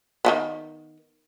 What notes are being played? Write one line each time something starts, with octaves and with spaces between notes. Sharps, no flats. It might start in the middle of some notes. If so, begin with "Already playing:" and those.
D#3 F#3 B3